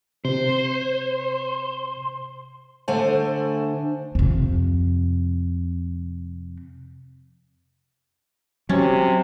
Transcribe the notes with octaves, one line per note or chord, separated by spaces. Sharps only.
C3 C5
D3 A3 C5 G#5
F2 C3
C3 F#3 C#4